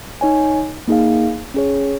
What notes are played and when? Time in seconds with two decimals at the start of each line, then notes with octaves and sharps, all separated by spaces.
0.21 D#4 C#5 G#5
0.88 A#3 D#4 G#4 F5
1.54 C#4 G#4 C#5